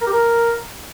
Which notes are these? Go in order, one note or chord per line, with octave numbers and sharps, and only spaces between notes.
A#4
G4
A#4